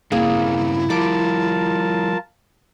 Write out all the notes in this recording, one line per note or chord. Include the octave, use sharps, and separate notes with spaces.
G2 C#3 A#3 C4 E4 G#4
F3 G3 F4 A#4 A5 D6